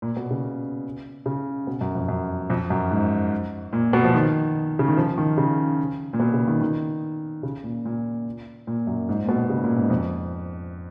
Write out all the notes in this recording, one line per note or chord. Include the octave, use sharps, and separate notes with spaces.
A#2
B2
C#3
C#3
B2
F#2
F2
F#2
F2
F#2
G#2
A#2
B2
F3
D#3
C#3
D#3
F3
D#3
C#3
A#2
B2
C#3
D#3
D#3
C#3
A#2
A#2
A#2
F#2
G#2
A#2
B2
C#3
A#2
G#2
F2